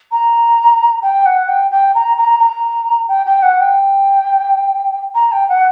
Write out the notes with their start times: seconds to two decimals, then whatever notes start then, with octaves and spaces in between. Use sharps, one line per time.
0.11 A#5
1.02 G5
1.25 F#5
1.48 G5
1.70 G5
1.94 A#5
2.17 A#5
2.39 A#5
3.08 G5
3.25 G5
3.42 F#5
3.60 G5
5.14 A#5
5.31 G5
5.48 F#5